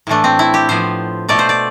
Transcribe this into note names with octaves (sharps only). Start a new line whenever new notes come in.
A2 E3 A3 D4
C4
E4
G4
A2 F3 B3 C5
B2 A3 D5
C5
D5